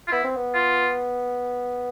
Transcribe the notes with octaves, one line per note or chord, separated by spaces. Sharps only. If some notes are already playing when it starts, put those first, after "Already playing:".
F4
B3 E4
C4
B3
F4